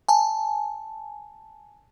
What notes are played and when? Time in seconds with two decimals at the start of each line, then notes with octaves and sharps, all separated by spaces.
0.09 G#5 A5